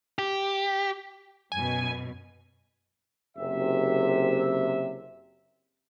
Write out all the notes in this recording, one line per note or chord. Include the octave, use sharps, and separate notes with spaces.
G4
F#2 B2 G#5
F#1 C3 E5